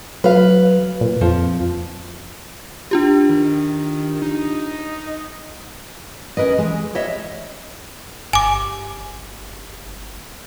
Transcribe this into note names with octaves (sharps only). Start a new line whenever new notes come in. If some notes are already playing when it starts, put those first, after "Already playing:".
F#3 B4 F5
A#2
F2 F3
D4 F4 G4
D#3
D#4
C#4 A#4 B4 D#5
E3 G#3
G3 C#5 D#5 E5
G1 G#5 D6